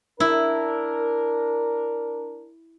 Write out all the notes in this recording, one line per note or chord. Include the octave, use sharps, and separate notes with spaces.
D4 E4 A#4